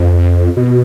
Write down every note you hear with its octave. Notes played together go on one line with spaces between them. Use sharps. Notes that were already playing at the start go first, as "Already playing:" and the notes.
Already playing: F2
B2